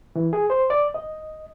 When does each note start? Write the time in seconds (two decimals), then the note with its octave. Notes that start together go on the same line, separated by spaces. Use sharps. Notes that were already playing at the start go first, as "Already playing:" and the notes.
0.16 E3
0.33 G#4
0.50 C5
0.70 D5
0.94 D#5